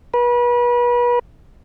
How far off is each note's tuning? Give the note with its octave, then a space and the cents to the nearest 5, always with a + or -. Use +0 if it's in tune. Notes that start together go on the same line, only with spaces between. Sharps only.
B4 -35